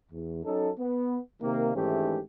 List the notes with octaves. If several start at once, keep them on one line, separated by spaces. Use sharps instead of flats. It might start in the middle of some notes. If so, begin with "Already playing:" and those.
E2
F#3 C#4 D#4 A4
B3
C3 D#3 A#3
G#1 G#2 E3 A3 C#4 G4